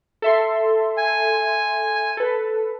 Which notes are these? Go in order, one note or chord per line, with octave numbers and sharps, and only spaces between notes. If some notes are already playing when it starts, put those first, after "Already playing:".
A4 E5 C6
G#5
A4 B4